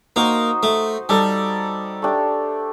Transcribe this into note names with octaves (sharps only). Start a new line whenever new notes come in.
A#3 D#4 F#4 C5 D#5
A3
G3 D#4 A4 D5
A3 D4 G4